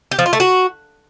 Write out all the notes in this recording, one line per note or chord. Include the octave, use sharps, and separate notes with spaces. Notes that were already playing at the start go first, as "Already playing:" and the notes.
G4
F3
F4
A3
F#4